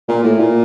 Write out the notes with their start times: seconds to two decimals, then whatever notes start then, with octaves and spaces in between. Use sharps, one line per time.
0.08 A#2
0.23 A2
0.39 A#2